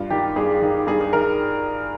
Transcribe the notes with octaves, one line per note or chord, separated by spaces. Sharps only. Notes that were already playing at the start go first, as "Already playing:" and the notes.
Already playing: G2 F4
D#3 G4
G2 G#4
D#3
G2 G#4
G#4
D#3 A#4